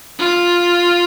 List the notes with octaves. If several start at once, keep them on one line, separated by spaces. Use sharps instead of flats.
F4